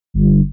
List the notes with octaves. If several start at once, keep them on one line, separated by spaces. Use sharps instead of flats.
G1